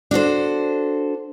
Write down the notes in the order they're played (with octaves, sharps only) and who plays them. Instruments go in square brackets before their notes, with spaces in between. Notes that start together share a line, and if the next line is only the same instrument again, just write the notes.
[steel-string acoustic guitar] D4 F#4 A4 C5